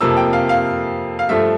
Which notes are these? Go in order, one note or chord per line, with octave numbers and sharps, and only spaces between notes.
F2 C3 F3 A#3 E6
G5
F5
F5
F5
G2 F3 A3 E5